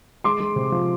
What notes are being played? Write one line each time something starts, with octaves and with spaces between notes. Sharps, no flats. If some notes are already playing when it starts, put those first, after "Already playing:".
G#3 C6 D6
G#3
C3
F3